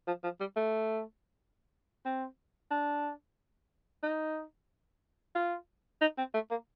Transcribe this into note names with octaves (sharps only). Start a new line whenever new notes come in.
F3
F3
G3
A3
C4
D4
D#4
F4
D#4
C4
A3
A#3